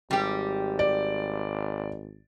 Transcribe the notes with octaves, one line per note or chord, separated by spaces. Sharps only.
G#1 G3 G4
D5